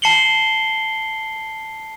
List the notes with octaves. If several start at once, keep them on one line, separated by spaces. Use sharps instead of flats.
A5 C7 C#7 F#7 G7